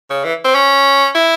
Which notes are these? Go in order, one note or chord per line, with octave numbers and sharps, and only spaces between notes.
C#3
E3
C4
C#4
E4